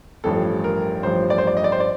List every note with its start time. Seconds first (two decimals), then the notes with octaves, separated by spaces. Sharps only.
0.24 A1 G2 F3 A4
0.64 A#4
1.03 A1 G2 F3 C5
1.30 D5
1.38 C5
1.47 D5
1.57 D#5
1.64 D5
1.72 C5
1.80 D5